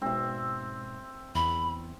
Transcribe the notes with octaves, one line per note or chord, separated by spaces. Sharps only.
G#2 B2 C4 E5
E2 B5